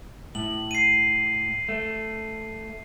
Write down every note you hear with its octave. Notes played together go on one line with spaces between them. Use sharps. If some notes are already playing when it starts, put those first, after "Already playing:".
A2 F#7
C7 D#7
A3